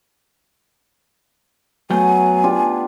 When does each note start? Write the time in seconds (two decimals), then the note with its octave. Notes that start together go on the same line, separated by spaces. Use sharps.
1.90 F#3 A3 B3 G5 G#5
2.44 D4 F4 G4